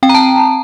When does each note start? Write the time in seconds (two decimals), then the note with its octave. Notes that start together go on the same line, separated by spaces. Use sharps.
0.03 C4 G5
0.09 A#5
0.14 A5